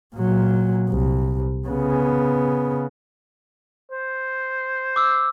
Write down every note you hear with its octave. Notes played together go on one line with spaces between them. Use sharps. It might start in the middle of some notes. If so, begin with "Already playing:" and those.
A#2 F#3
C2
C#3 B3
C5
D6 E6